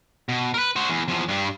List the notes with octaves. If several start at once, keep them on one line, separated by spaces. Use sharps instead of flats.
B2
A#4 B4
F#4 C5
E2
E2 F3
G2 G3